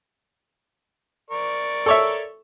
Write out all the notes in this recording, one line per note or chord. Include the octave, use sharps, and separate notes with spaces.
A#4 D5 C#6
A4 C#5 E5